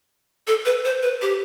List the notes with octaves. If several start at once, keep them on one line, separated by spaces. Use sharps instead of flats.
A4
B4
C5
B4
G4